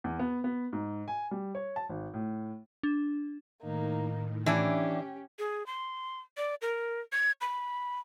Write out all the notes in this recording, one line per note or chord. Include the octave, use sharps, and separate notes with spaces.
E2
B3
B3
G#2
G#5
G3
C#5
A5
G#1
A2
D4
A2 D#3 A#3 D#4
E3 C#4 D4 E4 G4
G#4
C6
D5
A#4
G#6
B5